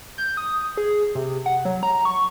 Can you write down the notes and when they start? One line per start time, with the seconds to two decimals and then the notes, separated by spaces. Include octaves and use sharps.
0.18 G6
0.37 D#6
0.77 G#4
1.15 C3
1.46 F#5
1.65 F#3
1.83 A#5
2.05 C#6